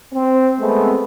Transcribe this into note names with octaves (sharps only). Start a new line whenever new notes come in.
C4
G#3 A3 B3 C4